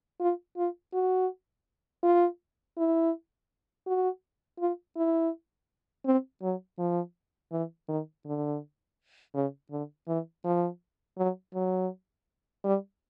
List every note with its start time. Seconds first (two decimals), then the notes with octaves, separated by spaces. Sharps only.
0.20 F4
0.57 F4
0.94 F#4
2.03 F4
2.77 E4
3.87 F#4
4.59 F4
4.96 E4
6.05 C4
6.42 F#3
6.79 F3
7.52 E3
7.89 D#3
8.25 D3
9.35 C#3
9.71 D3
10.08 E3
10.45 F3
11.18 F#3
11.54 F#3
12.64 G3